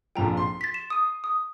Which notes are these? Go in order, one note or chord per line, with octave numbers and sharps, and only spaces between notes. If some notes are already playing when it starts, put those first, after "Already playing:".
A#1 F2 F3 G5 A#5
C6
A6 B6
E7
D#6 D#7
D#6